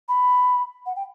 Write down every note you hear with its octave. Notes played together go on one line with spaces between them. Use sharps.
B5
F#5
G5